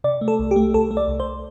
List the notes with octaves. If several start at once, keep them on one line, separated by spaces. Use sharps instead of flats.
C3 D5
A3
A4
C2
G4
A3
C2 A4
A3
D5
C2
C5